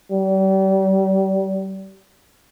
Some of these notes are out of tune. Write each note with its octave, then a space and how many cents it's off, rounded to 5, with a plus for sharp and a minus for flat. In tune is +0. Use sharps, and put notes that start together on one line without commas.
G3 -35